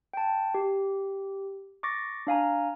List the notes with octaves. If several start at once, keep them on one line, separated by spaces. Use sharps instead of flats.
G5 A5
G4
C#6 D6 A6 A#6
D4 F5 G#5 A#5